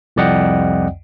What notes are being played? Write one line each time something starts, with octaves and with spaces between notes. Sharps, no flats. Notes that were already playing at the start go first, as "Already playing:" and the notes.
C2 F2 D5 D#5 F#5 G5